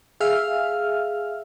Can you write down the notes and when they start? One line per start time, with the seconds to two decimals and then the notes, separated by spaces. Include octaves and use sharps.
0.20 G#4 E5 F5 F6